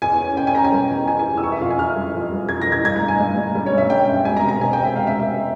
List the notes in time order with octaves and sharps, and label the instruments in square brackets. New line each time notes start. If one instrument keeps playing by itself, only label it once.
[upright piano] E2 G#5
C#4
C#4 G5
G#5
C#4 A#5
G#5
G3 G5
E2
E3 G#5
G#5
E2
E6
E3 C#6
E5
F2 F5
G#5
E3 F6
G3
F2
G3
E3 G#6
A#6
E3 G#6
G2 G#6
A#5
G2
G#5
G2
G2
G3
C#5
G2 E5
C#4 G5
G2
E1 G#5
A#5
C3
A#5
C3 G#5
G5
C3
E5
E1 F5
E5
E1
E5